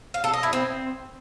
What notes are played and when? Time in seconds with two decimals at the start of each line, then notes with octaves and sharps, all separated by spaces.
0.14 F5
0.24 A4
0.33 D#5
0.43 E4
0.53 C4